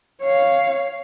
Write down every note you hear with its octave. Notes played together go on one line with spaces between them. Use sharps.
C#5 F5